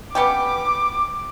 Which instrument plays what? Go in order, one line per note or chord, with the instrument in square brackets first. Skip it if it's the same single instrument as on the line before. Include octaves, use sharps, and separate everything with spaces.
[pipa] B3 C#4 G4 [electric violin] D6